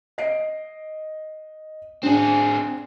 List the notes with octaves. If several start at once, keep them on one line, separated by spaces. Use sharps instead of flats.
D#5 C7 D7
C4 D4 G#4